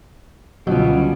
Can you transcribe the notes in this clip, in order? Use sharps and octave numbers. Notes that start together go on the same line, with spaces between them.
C#2 B2 D3 F#3 G3 C#4 F4